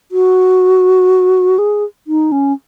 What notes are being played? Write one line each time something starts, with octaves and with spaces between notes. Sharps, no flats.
F#4
G#4
D#4
C#4